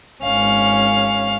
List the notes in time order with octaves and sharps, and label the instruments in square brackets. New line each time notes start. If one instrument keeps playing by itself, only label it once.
[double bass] G#1 C#4 [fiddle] F5